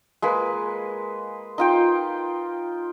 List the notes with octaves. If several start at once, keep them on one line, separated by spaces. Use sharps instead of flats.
G#3 A#3 B4
D#4 F4 G5